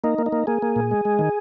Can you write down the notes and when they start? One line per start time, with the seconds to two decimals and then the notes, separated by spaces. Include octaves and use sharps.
0.04 A#3 D#4
0.18 A#3
0.26 D#4
0.32 A#3
0.47 A#3 G#4
0.62 A#3
0.76 A#2
0.91 G#3
1.05 G#3
1.19 D#3